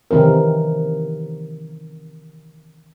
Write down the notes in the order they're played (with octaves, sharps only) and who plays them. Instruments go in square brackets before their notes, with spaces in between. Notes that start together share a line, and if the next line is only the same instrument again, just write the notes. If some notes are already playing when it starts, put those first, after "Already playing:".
[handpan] C3 D#3 E3 C4 A#4